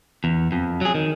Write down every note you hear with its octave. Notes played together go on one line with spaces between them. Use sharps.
E2
F2
F#3 G#4
D#3